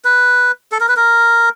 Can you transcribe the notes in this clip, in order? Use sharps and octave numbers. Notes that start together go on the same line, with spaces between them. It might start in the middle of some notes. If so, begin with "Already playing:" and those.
B4
A4
A#4
B4
A#4